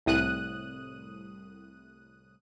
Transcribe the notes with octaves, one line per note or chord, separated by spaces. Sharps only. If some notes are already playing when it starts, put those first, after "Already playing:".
C2 A2 D#6 F#6 D#7